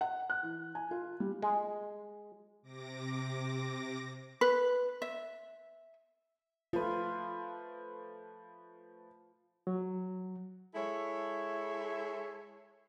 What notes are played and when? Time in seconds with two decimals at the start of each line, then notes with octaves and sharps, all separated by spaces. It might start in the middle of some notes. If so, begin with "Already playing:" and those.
0.01 F#5
0.30 F#6
0.43 E3
0.75 G#5
0.91 F4
1.20 G3
1.43 G#3
2.62 C3 D6 A#6
4.41 B4
5.02 E5
6.73 F3 A3 F4 B4
9.67 F#3
10.75 G#3 E4 A4 C#5 E5